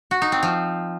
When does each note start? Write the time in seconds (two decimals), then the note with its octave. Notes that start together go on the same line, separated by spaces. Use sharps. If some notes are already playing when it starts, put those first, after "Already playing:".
0.11 F#4
0.22 D#4
0.32 C4
0.43 F3